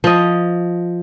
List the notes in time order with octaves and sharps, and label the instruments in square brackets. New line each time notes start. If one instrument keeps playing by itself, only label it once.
[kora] F3 D#5